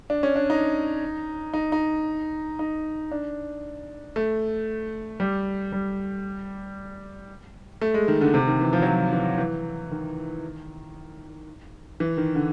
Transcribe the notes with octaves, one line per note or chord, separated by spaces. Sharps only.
D4
C#4
D4
D#4
D#4
D#4
D#4
D4
A3
G3
G3
A3
G#3
D#3
D3
C3
D#3
E3
F3
F#3
F3
E3
E3
D#3
E3
D#3
D3